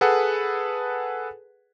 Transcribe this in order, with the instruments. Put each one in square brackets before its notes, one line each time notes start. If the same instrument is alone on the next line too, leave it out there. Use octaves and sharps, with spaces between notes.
[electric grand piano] G#4 A4 B4 F#5